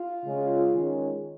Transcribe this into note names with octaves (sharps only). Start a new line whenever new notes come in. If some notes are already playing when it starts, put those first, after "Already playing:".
Already playing: F4
C#3 G#3 C#4
D#3 G#3 C#4